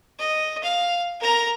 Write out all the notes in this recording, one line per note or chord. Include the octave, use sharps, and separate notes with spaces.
D#5
F5
A#4 A#5